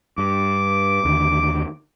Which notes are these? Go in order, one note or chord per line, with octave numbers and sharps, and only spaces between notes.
G2 D6
D#2 D3